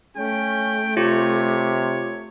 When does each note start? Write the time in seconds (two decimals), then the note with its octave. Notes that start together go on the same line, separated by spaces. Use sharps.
0.17 A3 C#4 G5
0.97 C3 F4 G4 C#5